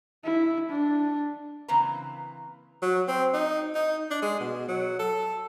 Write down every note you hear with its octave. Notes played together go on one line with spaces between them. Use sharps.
E4
D4
C#3 E3 A#3 C4 B4 A#5
F#3
C4
D#4
D#4
D4
G#3
B2
F#3
A4